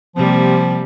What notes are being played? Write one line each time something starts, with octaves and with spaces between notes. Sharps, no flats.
C3 F3 G3 A#3